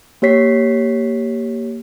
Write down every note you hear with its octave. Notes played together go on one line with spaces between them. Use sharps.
A#3 G4 C#5 B6 C7